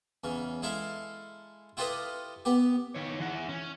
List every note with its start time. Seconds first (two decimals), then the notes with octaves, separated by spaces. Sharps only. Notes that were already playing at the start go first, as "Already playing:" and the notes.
0.24 E2 C#3
0.62 G#3 E4 A4 E5 F5
1.77 E4 F4 G4 A4 B4 D#5
2.45 B3 G4
2.95 D#3 C#5
3.20 E3 F#5
3.49 C#4